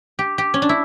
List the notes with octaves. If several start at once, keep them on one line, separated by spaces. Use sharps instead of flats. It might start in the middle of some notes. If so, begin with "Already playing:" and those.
G4
G4
C#4
D4
E4